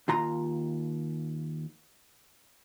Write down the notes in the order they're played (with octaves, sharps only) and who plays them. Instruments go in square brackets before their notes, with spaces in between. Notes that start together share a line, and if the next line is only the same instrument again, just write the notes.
[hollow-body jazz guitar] D#2 F4 A#5 C6